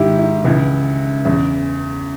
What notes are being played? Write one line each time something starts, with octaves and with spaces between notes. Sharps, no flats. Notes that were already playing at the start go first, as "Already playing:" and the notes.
Already playing: G#2 D#3 E4 G4
E4
C#2 C#3 E3
E2 C#3 E3